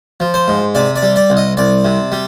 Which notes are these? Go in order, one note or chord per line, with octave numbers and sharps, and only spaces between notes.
F3
C5
G#2
C3 D5
D5
G3
D5
C2
D#5
C2 D5
C3
G3